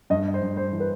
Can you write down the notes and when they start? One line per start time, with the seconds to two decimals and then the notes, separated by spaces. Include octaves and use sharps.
0.10 G2 D#5
0.34 C5
0.42 G2
0.57 C5
0.72 E3
0.80 B4